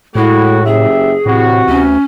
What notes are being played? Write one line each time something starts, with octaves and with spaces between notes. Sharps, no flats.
A2 G#3 A3 E4 F#4
F#1 G4 G#4 E5
A2 C3 E3 F#4
D2 C#4